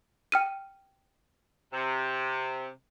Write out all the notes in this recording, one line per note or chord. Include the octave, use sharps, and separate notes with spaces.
G5 F6 D#7
C3